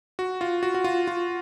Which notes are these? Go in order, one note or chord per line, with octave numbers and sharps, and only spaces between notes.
F#4
F4
F#4
F#4
F4
F4